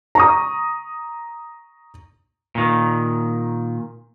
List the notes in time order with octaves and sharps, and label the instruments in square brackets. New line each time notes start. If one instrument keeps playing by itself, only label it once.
[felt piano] A#5 C#6 D#6
[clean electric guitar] A#2 D#3